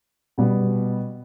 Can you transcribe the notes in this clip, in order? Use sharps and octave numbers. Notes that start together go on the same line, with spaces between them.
B2 G3 B3